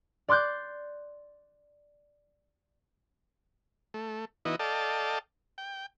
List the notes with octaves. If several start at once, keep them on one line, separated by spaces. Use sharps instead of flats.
D5 C6 D6 F#6 G6
A3
E3 B3 D#4 E4 F#4 D#5
A4 D5 D#5 F5 G5 A5
G5